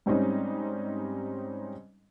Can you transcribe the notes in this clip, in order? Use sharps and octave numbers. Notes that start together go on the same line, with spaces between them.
G#2 G3 C4 C#4 D#4